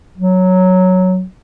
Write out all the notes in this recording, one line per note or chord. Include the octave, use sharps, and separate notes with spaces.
F#3